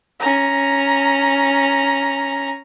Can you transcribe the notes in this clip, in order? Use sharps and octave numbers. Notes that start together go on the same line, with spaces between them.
C#4 A#5